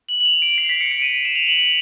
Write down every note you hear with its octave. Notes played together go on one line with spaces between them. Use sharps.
F#7
F#7
F7
D7
C7
B6
C#7
D7
D#7
D#7
E7
F7
F#7
F#7